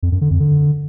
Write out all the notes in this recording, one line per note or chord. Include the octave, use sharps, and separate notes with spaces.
F2
F#2
D3
F2
D3